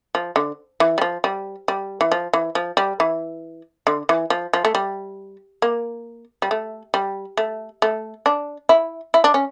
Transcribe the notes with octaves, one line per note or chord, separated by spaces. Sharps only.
F3
D3
E3
G3
F3
G3
G3
E3
F3
E3
F3
G3
E3
D3
E3
F3
F3
A3
G3
A#3
G3
A3
G3
A3
A3
D4
E4
E4
D4
C#4